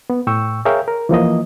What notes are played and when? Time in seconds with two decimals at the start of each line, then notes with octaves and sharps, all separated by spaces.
0.10 B3
0.27 A2 G5 C#6 E6
0.65 G#4 A#4 C#5 E5 F5 G5
0.88 A#4
1.09 E3 F3 A#3 D#5